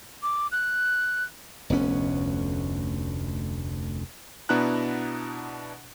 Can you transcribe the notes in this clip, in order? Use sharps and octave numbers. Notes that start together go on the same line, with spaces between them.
D6
F#6
F1 D2 B3 C#4
B2 B3 D4 E4 A#5 F#6